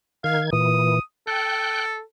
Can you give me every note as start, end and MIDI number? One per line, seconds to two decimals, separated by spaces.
0.24 0.50 51
0.24 0.42 77
0.24 0.50 92
0.53 0.99 46
0.53 0.99 52
0.53 1.00 87
1.27 2.02 69
1.27 1.85 79
1.27 1.85 90